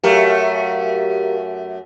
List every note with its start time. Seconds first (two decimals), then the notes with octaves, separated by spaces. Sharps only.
0.04 F#2 A3 G4 A#4 F5